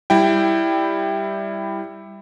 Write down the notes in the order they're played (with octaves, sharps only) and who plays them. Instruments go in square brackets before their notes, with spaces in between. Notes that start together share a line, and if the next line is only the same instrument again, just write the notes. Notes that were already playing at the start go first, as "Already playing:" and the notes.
[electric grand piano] G3 E4 G5